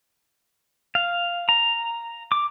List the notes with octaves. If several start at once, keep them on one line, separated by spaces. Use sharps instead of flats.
F5
A#5
D6